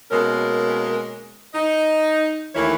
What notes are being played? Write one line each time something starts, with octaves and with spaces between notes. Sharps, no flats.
B2 G#3 A#3 C#4 A#4
D#4 D#5
D#2 E3 A3 E4 A#4 C#5